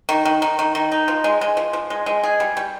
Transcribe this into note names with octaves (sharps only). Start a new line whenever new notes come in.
D#3
D#3
D#3
D#3
D#3
D#4
F3
G#3
G#3
F3
F3
G#3
G#3
G#4
G3
G3